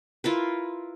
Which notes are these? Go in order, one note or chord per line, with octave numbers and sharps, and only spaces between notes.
E4 F4 A#4 B4